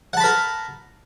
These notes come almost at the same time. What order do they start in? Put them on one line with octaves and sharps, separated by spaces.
F#5 A5 B5 A#4